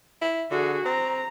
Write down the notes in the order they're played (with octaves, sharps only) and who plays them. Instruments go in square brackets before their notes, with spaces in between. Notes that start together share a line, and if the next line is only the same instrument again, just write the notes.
[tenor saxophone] E4
[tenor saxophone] D3 [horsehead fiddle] F#4 G#4
[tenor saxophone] C4 [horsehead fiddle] A#5